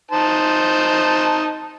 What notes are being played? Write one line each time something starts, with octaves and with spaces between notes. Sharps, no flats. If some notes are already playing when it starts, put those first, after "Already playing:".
D#4 C5 A5